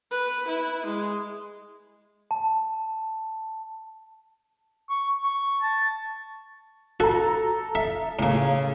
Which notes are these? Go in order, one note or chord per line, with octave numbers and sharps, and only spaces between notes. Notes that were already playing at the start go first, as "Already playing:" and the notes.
B4
E4
G#3
A5
C#6
C#6
A5
F#4 A4 A#5
E5
A2 C#3 A#3